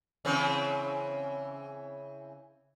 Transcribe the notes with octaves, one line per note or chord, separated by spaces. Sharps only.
C#3 E3 C4